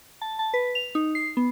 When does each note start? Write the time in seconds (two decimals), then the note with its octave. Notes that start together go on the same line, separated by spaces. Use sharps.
0.22 A5
0.39 A5
0.54 B4
0.75 F7
0.95 D#4
1.15 C7
1.37 B3